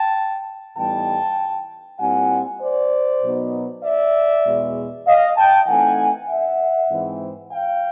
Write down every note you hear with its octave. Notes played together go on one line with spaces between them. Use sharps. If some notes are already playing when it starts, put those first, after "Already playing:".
Already playing: G5 A5
A2 E3 G3 B3 D#4 G5 A5
A#2 G3 C4 E4 F#5 G#5
C5 D5
B2 F#3 B3 D#4
D5 E5
E2 B2 G#3
D#5 F5
G5 A5
E3 A3 C4 D#4 F#5 G#5
E5 F#5
G#2 E3 G#3 C4
F5 G5